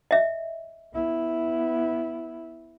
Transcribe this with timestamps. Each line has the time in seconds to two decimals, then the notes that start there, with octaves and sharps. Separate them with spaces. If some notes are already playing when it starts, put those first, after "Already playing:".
0.11 D#5 E5
0.94 B3 E4